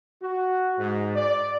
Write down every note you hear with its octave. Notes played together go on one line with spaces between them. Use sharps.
F#4
G#2
D5